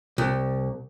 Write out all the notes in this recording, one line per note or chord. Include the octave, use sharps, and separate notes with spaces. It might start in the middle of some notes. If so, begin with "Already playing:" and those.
C2